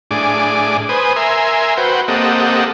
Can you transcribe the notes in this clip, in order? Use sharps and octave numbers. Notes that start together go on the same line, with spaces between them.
A2 D4 G#4 D6
B4 C5 G#5 D#6
A#4 E5 G#5 C6
F#4 B4 C5 G5
A#3 C4 G4 A4 D#5 F#5